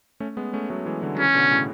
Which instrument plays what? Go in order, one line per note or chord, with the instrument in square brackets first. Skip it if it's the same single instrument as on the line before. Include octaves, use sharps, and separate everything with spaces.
[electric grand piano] A3 C#4
G#3 B3
A3 C#4
F#3 A3
E3 G#3
D3 F#3
F#3
[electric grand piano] C#3 E3 [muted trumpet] C#4
[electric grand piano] B2 D3
A2 C#3